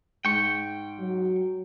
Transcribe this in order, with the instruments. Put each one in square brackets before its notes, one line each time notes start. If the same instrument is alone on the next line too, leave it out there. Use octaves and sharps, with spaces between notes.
[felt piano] G#2 [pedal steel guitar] G5 C#6
[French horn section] F#3